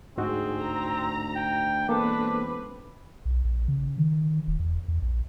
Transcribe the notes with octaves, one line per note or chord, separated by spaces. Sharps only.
D2 G#2 C4 D#4 F#4 G#4
A#5
G5
E1 A#3 C4 D4 A4 B4
B1
A#1
C#3
D#3
D#1
E2
E2
A#1